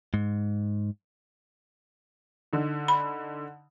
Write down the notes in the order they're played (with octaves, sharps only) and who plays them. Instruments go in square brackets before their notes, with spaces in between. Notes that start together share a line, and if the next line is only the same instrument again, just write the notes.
[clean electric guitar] G#2
[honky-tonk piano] D3 D#4
[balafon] B5